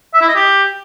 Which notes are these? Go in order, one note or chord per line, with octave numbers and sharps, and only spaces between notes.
E5
E4
D#5
G4